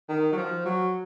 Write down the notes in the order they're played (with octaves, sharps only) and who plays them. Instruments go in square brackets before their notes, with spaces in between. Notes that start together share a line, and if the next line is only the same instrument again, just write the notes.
[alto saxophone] D#3
F#3
F3
F#3